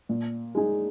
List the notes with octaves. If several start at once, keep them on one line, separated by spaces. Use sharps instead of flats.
A#2
G#3 D#4 G#4